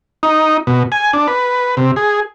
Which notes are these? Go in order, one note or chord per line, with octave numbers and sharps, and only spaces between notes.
D#4
B2
G#5
D4
B4
C3
G#4